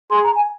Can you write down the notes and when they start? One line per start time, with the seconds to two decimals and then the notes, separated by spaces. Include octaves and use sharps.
0.10 G#4 C6
0.24 A#5
0.35 G#5